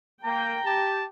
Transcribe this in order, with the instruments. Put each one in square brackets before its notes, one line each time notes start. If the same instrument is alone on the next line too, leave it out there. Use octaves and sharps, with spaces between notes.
[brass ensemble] A#3 [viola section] G5 [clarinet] A#5
[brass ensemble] G4 [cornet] A5